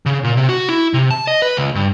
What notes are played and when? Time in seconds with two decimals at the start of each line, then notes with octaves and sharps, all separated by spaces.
0.06 C#3
0.24 A#2
0.37 C3
0.49 F#4
0.69 E4
0.94 C3
1.11 A5
1.27 D#5
1.42 B4
1.57 C#2
1.75 G2